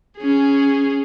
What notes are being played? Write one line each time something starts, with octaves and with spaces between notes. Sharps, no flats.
C#4 G#4